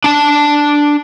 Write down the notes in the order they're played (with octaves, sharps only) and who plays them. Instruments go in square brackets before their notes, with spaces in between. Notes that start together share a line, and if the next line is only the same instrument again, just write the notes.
[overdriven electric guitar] D4 A5